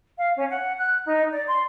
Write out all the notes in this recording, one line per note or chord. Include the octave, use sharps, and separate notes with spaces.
F5
C#4
F#5
F#6
D#4
D5
C6